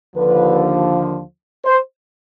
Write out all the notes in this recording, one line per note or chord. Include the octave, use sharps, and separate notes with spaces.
D#2 D3 F3 B4
C5